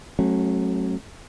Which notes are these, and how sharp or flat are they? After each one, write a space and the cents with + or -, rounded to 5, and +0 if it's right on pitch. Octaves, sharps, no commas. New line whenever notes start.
F#3 +0 A3 -25 C#4 -40